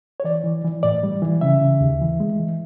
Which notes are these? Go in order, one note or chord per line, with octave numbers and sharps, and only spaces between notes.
C#5
E3 D5
E3
E3
A2 D5
G3
E3
C#3 E5
C#3
D#2
E3
G#3
E3